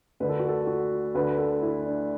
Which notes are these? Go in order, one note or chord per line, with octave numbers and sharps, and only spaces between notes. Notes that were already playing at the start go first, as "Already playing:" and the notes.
D2 D3 B4
A4
F#4
A4
F#4
D2 D3 B4
A4
E4
D4